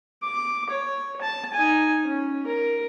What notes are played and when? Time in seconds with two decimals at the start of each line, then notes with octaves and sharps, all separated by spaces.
0.22 D6
0.70 C#5
1.21 A5
1.54 D#4 G#5
2.04 C#4
2.46 A#4